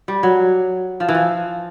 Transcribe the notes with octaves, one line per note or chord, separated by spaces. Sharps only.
G3
F#3
F3
E3
F3